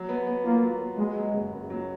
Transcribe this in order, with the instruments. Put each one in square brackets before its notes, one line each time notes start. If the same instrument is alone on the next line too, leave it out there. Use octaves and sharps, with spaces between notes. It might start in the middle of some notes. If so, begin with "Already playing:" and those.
Already playing: [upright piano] F#3
B3
B3
[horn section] A#3 [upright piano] F4
[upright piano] F#3
B3
[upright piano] F#3 [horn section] G#3
[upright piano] F#3
F#1
F#1
F#3